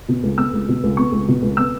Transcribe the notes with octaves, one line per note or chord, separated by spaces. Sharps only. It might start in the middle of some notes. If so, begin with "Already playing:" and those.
B2
C#2
B3 E6
C#2
B2
C#2
B3 C#6
C#2
B2
C#2
B3 E6